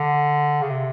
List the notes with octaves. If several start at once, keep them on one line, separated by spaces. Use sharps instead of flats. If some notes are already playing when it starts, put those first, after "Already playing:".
Already playing: D3
C#3
C3